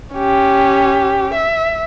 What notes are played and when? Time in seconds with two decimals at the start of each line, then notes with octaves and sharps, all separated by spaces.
0.15 C#4 G4
1.33 E5